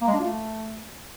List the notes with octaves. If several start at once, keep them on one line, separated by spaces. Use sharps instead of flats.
A#3
G#3
D4
F4
A3